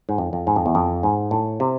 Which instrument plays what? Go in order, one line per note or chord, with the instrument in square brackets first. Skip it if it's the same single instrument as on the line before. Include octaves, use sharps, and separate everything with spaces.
[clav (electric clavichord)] G#2
F2
F2
G#2
F2
E2
F2
G#2
A2
C3